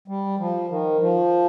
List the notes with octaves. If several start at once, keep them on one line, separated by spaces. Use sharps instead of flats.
G3
F3
D#3
F3